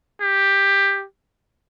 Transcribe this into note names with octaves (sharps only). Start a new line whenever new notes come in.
G4